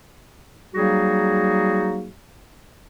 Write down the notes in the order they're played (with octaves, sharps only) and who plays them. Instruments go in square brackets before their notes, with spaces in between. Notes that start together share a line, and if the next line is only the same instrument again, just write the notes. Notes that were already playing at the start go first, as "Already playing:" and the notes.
[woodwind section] F#3 G3 A#3 D#4 F#4 G#4